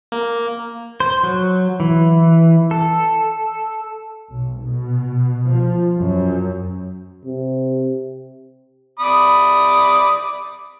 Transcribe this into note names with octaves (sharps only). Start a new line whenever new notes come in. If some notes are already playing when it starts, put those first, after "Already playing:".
A#3
C5
F#3
E3
A4
B1
B2
F3
F#2
C3
D5 B5 D#6